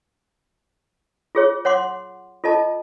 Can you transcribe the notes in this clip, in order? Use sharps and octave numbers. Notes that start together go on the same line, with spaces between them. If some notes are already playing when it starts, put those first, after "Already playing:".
F4 G#4 C#5
C#5 F#5 C6 D6
F4 A4 D#5 A5